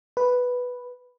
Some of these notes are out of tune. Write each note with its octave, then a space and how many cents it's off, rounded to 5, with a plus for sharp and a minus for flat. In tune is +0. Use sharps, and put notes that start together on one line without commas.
B4 +0